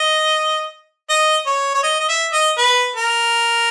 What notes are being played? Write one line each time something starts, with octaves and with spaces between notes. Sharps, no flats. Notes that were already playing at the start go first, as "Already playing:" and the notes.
Already playing: D#5
D#5
C#5
C#5
D#5
D#5
E5
D#5
B4
A#4